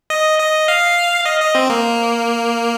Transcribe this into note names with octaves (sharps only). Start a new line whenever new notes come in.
D#5
D#5
F5
D#5
D#5
C4
A#3